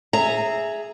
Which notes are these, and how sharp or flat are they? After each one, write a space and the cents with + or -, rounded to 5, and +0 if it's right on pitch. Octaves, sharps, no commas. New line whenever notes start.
G#4 +5 E5 +0 A#5 -20